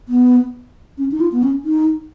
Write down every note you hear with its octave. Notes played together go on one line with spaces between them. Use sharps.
B3
C#4
D#4
F4
B3
C#4
D#4